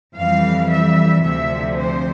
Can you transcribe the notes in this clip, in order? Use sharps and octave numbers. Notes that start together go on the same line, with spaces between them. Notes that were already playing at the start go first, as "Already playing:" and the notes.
F2 E3 G3 F5
E5
D2 C3 F3 E5
C5